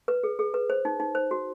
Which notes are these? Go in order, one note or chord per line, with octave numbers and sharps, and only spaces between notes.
B4
G#4
G#4
B4
C5
D#4
D#4
C5
F#4